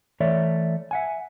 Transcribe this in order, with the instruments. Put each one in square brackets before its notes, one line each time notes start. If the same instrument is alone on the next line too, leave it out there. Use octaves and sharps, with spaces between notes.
[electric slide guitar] E3 A3 C#5 D5 E5
E5 F#5 G#5